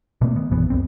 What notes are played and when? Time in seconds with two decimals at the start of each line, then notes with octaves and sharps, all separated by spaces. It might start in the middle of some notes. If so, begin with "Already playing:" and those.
0.21 B2 A3 A#3 C4
0.36 D#3 B3
0.51 A#1 F#2 E3 B3
0.70 C#2 F#2 C4